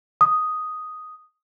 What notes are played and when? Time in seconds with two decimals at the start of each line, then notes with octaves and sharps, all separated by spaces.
0.21 D#6